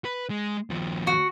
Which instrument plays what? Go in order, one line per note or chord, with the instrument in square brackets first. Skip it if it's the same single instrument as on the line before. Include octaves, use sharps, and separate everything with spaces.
[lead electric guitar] B4
G#3
D#2 F3
[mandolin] F#4